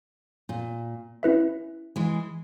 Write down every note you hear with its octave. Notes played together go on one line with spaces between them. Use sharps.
A#2
C#4 E4 B4 E5
E3 G#3